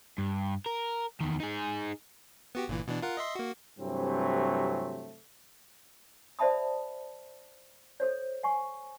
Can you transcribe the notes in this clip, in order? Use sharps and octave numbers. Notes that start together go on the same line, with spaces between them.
G2
A#4
E2 D#3
D#4 G#4
B3 F#4 G4
G1 A#2 E3
B2 E3 D4
F4 A#4 F#5
D#5 E5 C6
A#3 F#4
G2 C3 E3 F#3 A3 C4
C5 D5 E5 A5 B5 D#6
A4 C5 C#5
F#5 G#5 C#6